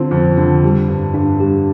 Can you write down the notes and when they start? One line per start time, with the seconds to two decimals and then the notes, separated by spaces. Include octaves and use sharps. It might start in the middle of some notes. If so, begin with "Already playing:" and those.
Already playing: D3 C4 D4 F4
0.11 F2
0.37 D3
0.63 G3
0.89 G2
1.14 G2 D4
1.40 G3 G4